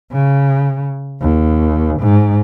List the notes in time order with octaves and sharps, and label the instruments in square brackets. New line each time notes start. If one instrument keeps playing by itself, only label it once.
[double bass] C#3
D#2
G#2